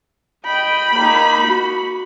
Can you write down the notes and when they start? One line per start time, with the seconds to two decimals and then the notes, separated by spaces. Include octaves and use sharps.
0.46 D#5 G5 B5
0.94 A#3 D#4
1.46 F#4